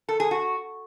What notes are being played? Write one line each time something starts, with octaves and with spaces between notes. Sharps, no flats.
A4
G#4
F#4